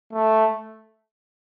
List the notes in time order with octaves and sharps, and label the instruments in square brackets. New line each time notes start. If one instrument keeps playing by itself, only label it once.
[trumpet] A3